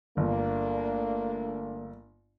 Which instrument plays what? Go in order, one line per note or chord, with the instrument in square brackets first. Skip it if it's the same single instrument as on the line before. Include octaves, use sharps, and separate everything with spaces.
[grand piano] G1 [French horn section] A3 A#3 D4